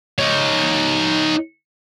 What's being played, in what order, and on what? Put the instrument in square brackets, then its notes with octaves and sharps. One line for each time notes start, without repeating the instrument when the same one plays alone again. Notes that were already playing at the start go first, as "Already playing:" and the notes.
[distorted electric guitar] D#4 C#5